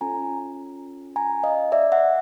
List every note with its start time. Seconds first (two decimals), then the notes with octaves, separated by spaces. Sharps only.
0.01 C#4 F4 A4 G#5 A#5
1.16 G#5 A#5
1.44 D#5 F5
1.72 D5 E5
1.92 E5 F#5